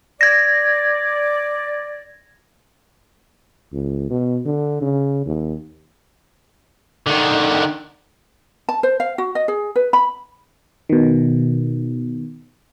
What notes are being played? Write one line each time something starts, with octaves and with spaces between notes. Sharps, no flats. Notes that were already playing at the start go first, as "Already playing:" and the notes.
D5 G#6 A#6
C#2
B2
D3
C#3
D#2
D3 D#3
A5
C5
F5
F#4
D#5
G#4
B4
B5
B2 D#3